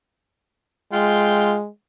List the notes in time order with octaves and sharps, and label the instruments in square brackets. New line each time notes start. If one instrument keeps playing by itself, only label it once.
[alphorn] G#3 [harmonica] F4 G5